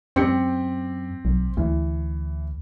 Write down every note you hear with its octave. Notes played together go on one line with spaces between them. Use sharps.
F#2 C4 G4 C#7
B1
D2 E3